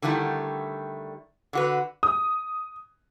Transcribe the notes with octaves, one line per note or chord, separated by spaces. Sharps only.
D3 D#3 G3 A3 E4
D3 F#4 B4
D#6